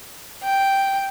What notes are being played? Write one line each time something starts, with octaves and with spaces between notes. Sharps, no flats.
G5